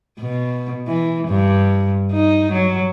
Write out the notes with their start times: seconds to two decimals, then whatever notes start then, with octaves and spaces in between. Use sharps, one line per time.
0.20 B2
0.87 E3
1.28 G2
2.12 D#4
2.52 F#3